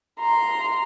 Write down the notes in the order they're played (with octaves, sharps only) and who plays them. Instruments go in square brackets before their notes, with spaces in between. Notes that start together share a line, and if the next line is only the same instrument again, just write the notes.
[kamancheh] A#5 C6